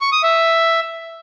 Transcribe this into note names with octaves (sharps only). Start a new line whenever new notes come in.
C#6
D#6
E5